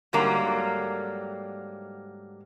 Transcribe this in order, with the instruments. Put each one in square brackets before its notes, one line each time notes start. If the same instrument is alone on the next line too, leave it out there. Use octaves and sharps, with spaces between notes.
[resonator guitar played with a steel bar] G#2 D3 F#3 G3 A#3 A#5